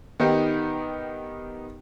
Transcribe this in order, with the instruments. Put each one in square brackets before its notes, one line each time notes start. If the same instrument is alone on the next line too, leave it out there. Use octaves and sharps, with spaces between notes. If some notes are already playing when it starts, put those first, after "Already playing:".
[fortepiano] D#3 B3 D#4 G4